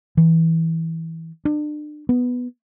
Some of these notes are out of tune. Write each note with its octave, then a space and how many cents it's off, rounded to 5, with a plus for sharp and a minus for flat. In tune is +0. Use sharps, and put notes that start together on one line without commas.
E3 -15
D4 +35
B3 +0